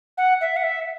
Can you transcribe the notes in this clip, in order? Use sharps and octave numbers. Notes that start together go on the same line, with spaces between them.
F#5
E5
F#5
E5